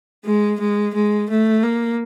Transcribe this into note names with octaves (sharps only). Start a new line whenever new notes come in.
G#3
G#3
G#3
A3
A#3